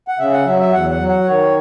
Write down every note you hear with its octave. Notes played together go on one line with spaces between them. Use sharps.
F#5
C#3 E5
F#5
F#3 E5
E5
E2 F#5
F#5
F#3
F#5
D#3 C#5